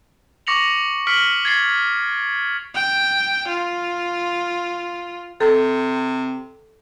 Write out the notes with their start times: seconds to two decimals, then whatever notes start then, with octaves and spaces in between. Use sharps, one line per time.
0.47 C#6 D6 A#6 C#7 F7 F#7
1.07 F6 A#6 B6 C#7 D7 F#7
1.45 G#6 A6 C7
2.75 G5
3.48 F4
5.41 C3 A4